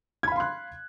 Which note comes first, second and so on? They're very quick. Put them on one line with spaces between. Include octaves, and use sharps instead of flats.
G#6 B5 F5 C6 F#6